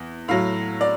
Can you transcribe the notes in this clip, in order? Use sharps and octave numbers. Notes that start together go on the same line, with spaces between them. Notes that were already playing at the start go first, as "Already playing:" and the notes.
Already playing: E2
A2 F#3 F5
D5